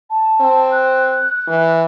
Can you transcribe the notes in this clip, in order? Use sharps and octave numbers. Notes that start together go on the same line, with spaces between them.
A5
C4
F#6
E3